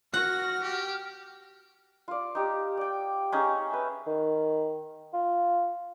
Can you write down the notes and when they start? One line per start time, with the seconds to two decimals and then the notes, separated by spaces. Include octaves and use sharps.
0.14 F#4 F#5 F6 A#6
0.62 G4
2.08 F4 D5
2.35 D#4 G4
2.77 D5 G5
3.32 C4 C#4 D#4 G#4
3.70 B4 E5
4.07 D#3
5.13 F4